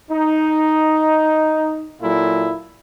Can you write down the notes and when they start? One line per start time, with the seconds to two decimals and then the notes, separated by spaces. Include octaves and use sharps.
0.10 D#4
2.01 A#2 F#3 E4 F4 A4